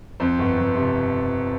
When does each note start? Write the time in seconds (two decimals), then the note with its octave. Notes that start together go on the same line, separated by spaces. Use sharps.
0.20 F2 C5
0.39 G1
0.57 G1
0.76 C3